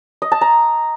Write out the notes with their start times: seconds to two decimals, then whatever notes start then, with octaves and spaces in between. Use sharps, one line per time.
0.22 D#5
0.32 A5
0.41 A#5